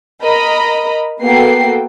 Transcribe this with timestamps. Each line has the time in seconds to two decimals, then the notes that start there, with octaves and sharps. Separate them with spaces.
0.24 A#4 D#5 A#5 B5
1.22 A#3 B3 F#4 A4 G5 C7